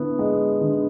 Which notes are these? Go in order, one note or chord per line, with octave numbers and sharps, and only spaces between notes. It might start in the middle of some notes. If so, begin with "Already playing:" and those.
Already playing: D3 B3 E4
G#3
D3